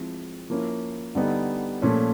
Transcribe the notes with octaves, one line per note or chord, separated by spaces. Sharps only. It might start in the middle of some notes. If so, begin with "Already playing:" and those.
Already playing: F3 G#3 C4 E4
F3 A#3 C#4 E4
D3 G3 B3 D#4
A#2 F3 A3 C#4